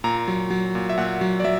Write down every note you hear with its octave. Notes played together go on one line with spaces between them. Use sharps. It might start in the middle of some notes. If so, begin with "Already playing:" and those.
A#2 A#5
F#3
F#3
A#2
E5
A#2 F#5
F#3
D5
F#3 E5